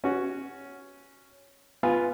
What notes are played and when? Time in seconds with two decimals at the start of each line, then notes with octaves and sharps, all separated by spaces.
0.04 C#4 F#4
1.83 B3 F4 B4 G#5